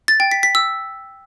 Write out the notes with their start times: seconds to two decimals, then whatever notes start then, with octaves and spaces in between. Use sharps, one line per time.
0.08 A6
0.20 G5
0.31 B6
0.43 B6
0.55 E6